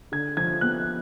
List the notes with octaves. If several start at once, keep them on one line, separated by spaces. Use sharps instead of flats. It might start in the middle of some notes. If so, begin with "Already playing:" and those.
D3 G#6
F3 G#6
B3 F#6